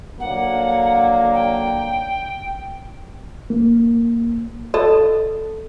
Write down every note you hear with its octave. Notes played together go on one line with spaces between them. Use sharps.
D3 F#3 A#3 F#5
G5
A#3
A4 D#5